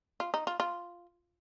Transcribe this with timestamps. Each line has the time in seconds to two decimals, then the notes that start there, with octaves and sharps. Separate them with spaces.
0.20 F4
0.34 D#4
0.47 F4
0.60 F4